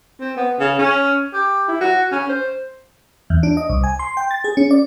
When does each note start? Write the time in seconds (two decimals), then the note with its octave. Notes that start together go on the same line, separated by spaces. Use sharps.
0.20 C4
0.37 B3
0.60 C#3
0.79 C#4
1.34 G4
1.68 E4
1.81 F#4
2.11 C#4
2.29 C5
3.30 E2
3.43 D4
3.57 D#5
3.69 C2
3.84 G#5
3.99 C6
4.17 G5
4.31 A6
4.44 G#4
4.57 C#4
4.71 D5